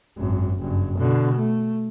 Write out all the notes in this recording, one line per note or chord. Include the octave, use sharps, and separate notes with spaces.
G#1 F#2
F#1 G2
B2 D3
A3